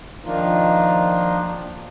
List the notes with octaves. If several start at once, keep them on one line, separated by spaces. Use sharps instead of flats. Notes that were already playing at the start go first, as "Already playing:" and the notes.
D#3 F3 A#3 D4 D#4 F4